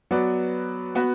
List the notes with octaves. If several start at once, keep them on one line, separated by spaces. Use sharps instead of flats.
F#3 B3 F#4 B4 D5
B3 F#4 B4